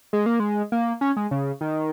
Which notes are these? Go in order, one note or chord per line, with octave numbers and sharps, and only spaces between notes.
G#3
A#3
G#3
A#3
C#4
G#3
C#3
D#3